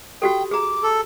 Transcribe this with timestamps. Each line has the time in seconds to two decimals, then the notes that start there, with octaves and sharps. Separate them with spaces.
0.22 F#4 G4 A4 G5
0.51 G#4 A#5 D6
0.83 A4